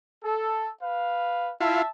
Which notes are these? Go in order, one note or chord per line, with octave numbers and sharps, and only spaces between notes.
A4
B4 F5
E4 F4 E5 A5